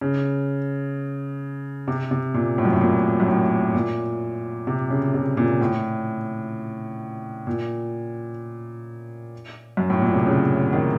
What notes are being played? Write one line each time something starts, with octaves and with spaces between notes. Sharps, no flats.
C#3
C3
C3
A#2
A2
F#2
A2
A#2
F#2
A2
A#2
C3
C#3
C3
A#2
A2
A#2
F#2
A2
A#2
C3
C#3
D#3